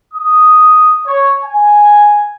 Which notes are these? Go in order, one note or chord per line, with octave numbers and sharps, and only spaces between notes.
D#6
C#5
G#5